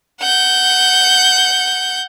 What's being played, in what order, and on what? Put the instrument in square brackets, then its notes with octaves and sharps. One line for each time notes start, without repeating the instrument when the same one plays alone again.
[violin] F#5 G6